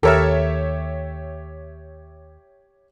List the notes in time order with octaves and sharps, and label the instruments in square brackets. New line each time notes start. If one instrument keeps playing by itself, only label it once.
[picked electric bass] D#2 [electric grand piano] G4 C#5 E5 [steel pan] A4 A#4